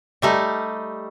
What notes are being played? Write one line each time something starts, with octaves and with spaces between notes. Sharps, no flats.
G3 A3 D#4